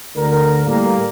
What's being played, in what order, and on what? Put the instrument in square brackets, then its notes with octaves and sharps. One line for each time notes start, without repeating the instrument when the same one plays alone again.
[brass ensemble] D2 D3 A#4
A2 G3 A#3